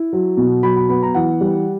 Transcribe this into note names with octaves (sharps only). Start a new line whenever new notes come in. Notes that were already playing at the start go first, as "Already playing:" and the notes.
Already playing: E4
F#3
B2
F#3 B5
B5
B3 B5
A#5
E3 F#5
G3